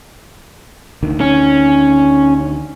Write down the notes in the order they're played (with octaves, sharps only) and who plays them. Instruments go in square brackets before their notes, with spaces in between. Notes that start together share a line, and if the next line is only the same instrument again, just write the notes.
[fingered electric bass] D2 D#3
[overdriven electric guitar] C#4